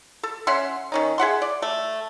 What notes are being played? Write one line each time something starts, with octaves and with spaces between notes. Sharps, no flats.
A4
C#4 E5 F#5 C6
D#3 C#4 D#4
G#4 E5 F#5 C6
D5
A3